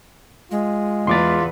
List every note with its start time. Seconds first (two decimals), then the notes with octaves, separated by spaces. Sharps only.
0.51 G#3 F4
1.07 E2 F4 B4 C6 D6 A6